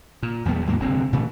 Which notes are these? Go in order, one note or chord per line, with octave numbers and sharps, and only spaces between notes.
A#2
A#1 E2 G3 B3
D#2 G#2 F#3 A#3
F1 G2 D3 C4
A#2 C#3 E3 A3